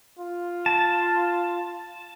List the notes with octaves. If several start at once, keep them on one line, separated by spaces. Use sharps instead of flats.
F4
A5